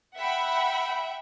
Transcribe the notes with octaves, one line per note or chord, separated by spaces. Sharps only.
E5 F#5 G5 B5